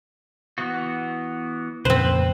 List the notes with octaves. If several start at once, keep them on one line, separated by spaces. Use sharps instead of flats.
E3 B3 F#4
F2 A#2 C#3 C4 B4 C5